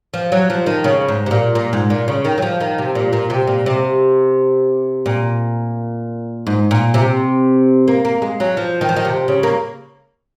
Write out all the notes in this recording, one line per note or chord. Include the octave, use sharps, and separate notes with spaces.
F3
F#3
F3
D#3
C#3
G#2
C3
A#2
A#2
G#2
A#2
C#3
D#3
F#3
F3
D#3
C3
A#2
A#2
C3
A#2
C3
A#2
G#2
A#2
C3
A#3
A#3
G#3
F#3
F3
D#3
F3
D#3
C3
C#3
A#3